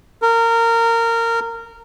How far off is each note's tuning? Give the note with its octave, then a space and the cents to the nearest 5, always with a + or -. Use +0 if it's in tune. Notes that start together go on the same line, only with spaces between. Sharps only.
A#4 -20